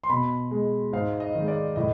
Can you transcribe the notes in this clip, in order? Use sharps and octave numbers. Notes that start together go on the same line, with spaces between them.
C6
B2 B5
G#3
G#2 F5
D#5
D#3 G#3
D5
A2 D#5